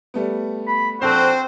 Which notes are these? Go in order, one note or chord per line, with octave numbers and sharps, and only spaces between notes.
G3 A3 B3
B5
A#1 C4 F#4 A4 C5